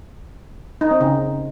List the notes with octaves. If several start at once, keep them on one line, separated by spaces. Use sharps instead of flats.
D#4
C4
C#3